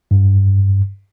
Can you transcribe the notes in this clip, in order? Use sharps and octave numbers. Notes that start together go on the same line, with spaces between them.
G2